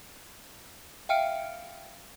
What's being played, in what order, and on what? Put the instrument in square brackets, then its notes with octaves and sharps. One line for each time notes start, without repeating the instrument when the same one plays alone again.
[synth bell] E5 F5 G5 F6 C#7 D7